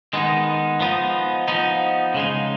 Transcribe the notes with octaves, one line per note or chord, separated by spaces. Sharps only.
D#3 G#3 B3 D#4
F3 B3 D#4
F3 B3 D#4
C#3 G#3 D#4